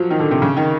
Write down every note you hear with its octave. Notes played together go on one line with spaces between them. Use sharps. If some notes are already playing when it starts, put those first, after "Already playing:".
Already playing: F3 F#3
D#3
D3
C3
C#3
D#3